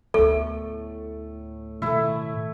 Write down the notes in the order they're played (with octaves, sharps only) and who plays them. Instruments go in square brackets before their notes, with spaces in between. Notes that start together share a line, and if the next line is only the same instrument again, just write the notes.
[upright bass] D2 B3 [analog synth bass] A2 [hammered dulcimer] A3 [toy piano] A4
[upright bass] B2 D#3 [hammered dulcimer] A3 E4